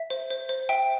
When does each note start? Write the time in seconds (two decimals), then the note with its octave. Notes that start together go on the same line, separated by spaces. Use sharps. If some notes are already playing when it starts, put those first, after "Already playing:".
Already playing: E5
0.10 C5
0.31 C5
0.49 C5
0.69 E5 G5